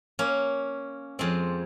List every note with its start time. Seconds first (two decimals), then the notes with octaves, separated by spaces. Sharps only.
0.19 A#3 C#4
1.19 F2 G#3 C4